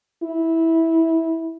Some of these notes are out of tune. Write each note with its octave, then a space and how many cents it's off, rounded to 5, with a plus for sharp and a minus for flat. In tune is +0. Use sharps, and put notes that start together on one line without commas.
E4 -15